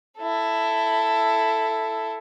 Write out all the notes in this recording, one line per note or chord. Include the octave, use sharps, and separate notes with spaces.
E4 A4